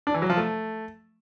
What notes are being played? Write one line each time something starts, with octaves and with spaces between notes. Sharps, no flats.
D4
E3
F#3
F3
A3